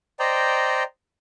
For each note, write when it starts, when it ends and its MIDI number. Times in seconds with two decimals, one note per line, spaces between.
0.19 0.83 72
0.19 0.83 74
0.19 0.83 75
0.19 0.83 79
0.19 0.83 82